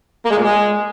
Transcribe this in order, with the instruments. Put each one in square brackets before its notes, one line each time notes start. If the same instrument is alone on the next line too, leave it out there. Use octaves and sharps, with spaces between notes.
[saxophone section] A#3
G#3
A#2
G#3